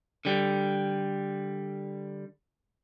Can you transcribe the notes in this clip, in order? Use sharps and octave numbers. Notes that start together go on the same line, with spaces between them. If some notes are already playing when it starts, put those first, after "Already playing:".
D3 G3